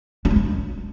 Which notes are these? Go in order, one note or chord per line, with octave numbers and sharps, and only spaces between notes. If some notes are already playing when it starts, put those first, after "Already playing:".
D4
G#3
D#4